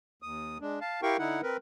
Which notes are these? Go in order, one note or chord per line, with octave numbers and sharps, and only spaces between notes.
D#2 D#6
G#3 D4
F5 A5
E4 G4 A#4 F5 G5 C#6
D3 D#4 E4 F#5
C4 A#4 B4